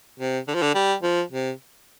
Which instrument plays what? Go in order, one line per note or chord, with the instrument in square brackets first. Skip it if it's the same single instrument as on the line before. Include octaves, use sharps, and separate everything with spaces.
[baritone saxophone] C3
D3
F3
D3
G3
F3
C3